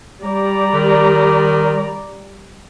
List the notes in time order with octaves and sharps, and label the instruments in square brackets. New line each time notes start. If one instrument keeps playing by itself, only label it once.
[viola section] G3 D5 A#5
[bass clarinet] D#3